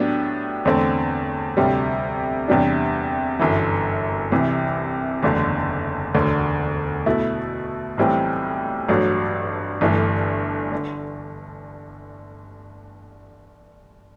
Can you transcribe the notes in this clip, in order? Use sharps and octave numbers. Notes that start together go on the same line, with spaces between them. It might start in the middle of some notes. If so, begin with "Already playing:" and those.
Already playing: A2 F#3 B3 D4 G4
E2 D3 A3 C4
D2 C3 G3
E2 C3 G3 D4
G1 F#2 E3
C2 C3 E3
F#1 E2 D3 A3
E1 D2 D3
B2 A3 E4
B1 A2 E3 G3 C4
A1 G2 F#3 A3
G1 G2 E3 A3
D3